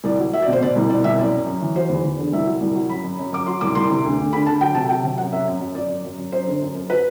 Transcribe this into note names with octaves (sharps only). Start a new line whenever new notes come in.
C2 D5
F#3
F#3 E5
D5
B2
C5
B2 D5
C2
B2 D5
C2 E5
F#2 D5
F#2
F#2
E3
F#3 C5
E2
E2
D3
C2 E5
F#3
C2
F#3
F#2 B5
F#2
F#2
F#2 D6
F#3 C6
C2 D6
C2 C6
C3
D2
D2
D3 B5
D3 A5
F#3 G5
C3 A5
F#3 G5
C3
F#2 F#5
F#2 E5
F#2
F#2
F#2 D5
F#2
F#2
F#2
F#2 C5
D3
F#2
F#2
F#3 B4